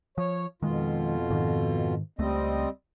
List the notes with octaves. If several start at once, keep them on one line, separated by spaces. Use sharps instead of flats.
F3 C#5
F2 B2 D#3 G#3 F4
G#2 D#3
C#2 G3 A3 C4 D#5